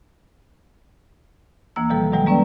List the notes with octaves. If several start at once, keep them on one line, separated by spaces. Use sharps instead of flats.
D2 E3 A#3 E6
B2 D#3 F3 G3 A4
F#2 B2 D#3 F#3 G#3 G5
G3 A#3 C#4 B4 D5